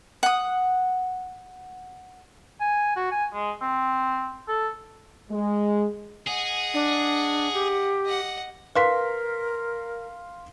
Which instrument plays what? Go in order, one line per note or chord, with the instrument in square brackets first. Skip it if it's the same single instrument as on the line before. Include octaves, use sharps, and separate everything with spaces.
[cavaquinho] F#5 D#6
[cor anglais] G#5
F#4
G#5
G#3
C4
A4
[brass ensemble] G#3
[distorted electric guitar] G#4 [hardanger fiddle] D#5 F#5
[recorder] D4
G4
[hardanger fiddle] D#5 F#5
[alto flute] A#4 [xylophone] B4 [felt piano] F5 C6 B6